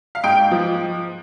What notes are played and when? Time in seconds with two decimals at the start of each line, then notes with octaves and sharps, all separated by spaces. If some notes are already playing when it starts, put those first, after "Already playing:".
0.15 F5
0.24 G#2 G5
0.51 F3